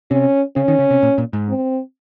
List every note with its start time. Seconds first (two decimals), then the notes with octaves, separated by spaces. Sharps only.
0.10 C3 C#4
0.56 C#3 C#4
0.68 D#3
0.79 C#3
0.91 C3
1.03 A#2
1.18 A#2
1.33 G#2
1.48 C4